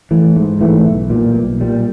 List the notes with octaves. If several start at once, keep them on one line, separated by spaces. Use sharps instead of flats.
E3 A3
G#2
E3 A3
B1
A#2 G3
B1
A#2 G3